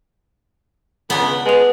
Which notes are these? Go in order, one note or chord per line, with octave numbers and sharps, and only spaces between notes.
C#2 B3 D4
G#3 B4 F7